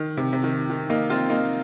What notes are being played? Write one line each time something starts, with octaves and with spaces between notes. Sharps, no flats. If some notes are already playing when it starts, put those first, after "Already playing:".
Already playing: D#3
C3
C3
D#3
D#3
A#3 D#4
C4 F4
A#3 D#4